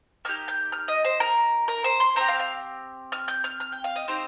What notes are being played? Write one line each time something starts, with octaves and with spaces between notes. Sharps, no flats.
A#3 D#4 G4 F6
G6
F6
D#5
C5
A#4
A#4
C5
C6
C4 G4 A#5
F5
F5
F6
G6
F6
F6
G5
F5
D#5
C4 D#4 G4 C5